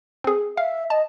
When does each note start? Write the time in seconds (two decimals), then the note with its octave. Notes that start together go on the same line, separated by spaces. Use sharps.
0.24 C4 G#4
0.57 E5 F5
0.90 D#5 A5